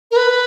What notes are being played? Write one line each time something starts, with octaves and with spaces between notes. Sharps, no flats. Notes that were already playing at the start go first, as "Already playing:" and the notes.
A#4
B4